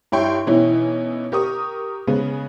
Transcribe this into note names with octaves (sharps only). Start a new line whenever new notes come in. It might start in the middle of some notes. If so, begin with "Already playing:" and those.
G2 E4 C#5 G5 C6 C#6
B2 E3 C#4 D#4 E4
G4 A#4 C#6 D#6
C#3 G#3 B3